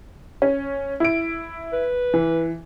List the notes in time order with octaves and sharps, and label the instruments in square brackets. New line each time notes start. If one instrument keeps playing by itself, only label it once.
[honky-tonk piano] C#4
E4 D7
[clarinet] B4
[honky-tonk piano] E3